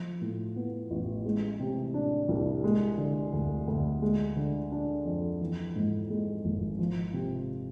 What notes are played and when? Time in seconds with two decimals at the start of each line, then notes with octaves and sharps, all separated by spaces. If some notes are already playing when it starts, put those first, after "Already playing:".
Already playing: F3
0.21 A2
0.56 B3
0.90 A1
1.25 G#3
1.60 C3
1.94 D4
2.29 C2
2.64 G#3
2.98 D3
3.33 D2
3.68 D2
4.02 G#3
4.36 D3
4.72 D4
5.05 F2
5.41 E3
5.76 G#2
6.10 G#3
6.45 G#1
6.79 F3
7.13 C3